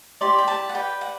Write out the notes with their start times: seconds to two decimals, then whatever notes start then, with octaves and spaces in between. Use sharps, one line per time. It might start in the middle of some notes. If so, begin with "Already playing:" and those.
0.21 E4 G4 D5 C6
0.38 G5
0.48 A5
0.69 F#5
0.74 G4 B4 D5 G5
1.01 F#5